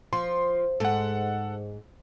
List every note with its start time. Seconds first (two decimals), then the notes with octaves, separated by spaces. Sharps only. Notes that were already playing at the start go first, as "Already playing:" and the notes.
0.13 F3 C6
0.80 G#2 A4 F#5